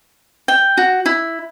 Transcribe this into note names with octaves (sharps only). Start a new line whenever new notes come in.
G5
F#4
E4